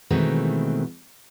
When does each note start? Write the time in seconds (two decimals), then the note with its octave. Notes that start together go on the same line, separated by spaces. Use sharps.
0.10 B2 D#3 E3 G#3 A3 C4